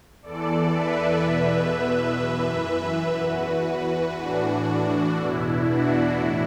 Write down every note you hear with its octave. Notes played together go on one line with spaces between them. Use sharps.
E2 E3 A4 D5
B4 E5
E2 B2
B4 E5
F#2 E3
E2 E3 F#4 B4
A2 E3 D4 F#4
D4
E2 B2 E4
D4 F#4
A2 E4